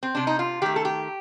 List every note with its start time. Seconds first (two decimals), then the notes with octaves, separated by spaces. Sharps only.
0.03 C4
0.15 C3 D4
0.27 D#4
0.39 F4
0.62 D#3 A3 G4
0.76 A4
0.85 G4